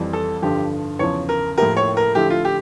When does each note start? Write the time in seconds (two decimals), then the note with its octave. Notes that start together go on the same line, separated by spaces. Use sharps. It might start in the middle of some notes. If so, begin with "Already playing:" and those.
Already playing: F2 E3 G3
0.13 A4
0.42 G2 D3 F3 G4
0.99 E2 C#3 F3 C#5
1.29 A#4
1.58 A2 F3 A#3 E4 G4 A#4
1.77 C#5
1.97 A#4
2.15 D3 F3 A3 E4 G4
2.30 F4
2.45 G4